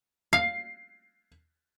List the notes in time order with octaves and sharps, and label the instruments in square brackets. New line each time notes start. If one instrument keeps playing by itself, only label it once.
[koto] F5 [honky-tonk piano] C7